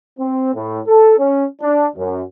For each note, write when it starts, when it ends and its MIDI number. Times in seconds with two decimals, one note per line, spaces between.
0.18 0.52 60
0.54 0.79 45
0.87 1.18 69
1.18 1.44 61
1.60 1.85 62
1.95 2.21 42